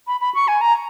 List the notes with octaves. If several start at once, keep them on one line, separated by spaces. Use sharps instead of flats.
B5
B5
C#6
G#5
A#5